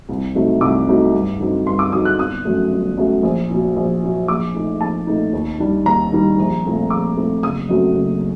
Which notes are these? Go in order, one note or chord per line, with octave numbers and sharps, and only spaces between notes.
C2
C3 F#3 A3 D#4
C2 D6
C3 F#3 A3 D#4
G2
D3 F#3 C4 D#4
G2 C6
D6
D3 F#3 C4 D#4 D#6
F#6
G1 D#6
F#2 F#3 A3
G1
F#2 F#3 A3
A#1
A#2 F#3
A#1
A#2 F#3
A#1 D6
A#2 A3 D#4
A#1 A5
A#2 A3 D#4
D#2
D#3 G3 D4
D#2 A#5
D#3 G3 D4
A#1
A#2 A3 C4
A#1 D6
A#2 A3 C4
F#1 D#6
F#2 F#3 A3 C4
F#1